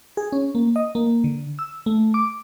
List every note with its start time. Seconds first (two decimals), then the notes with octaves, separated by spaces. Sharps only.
0.17 G#4
0.32 C#4
0.55 A#3
0.76 D#5
0.95 A#3
1.24 D3
1.59 E6
1.86 A3
2.14 D6